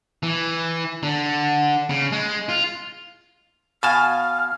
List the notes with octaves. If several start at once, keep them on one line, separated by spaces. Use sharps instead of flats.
E3
D3
C#3
G#3
F4
B2 F5 G#5 A5 F6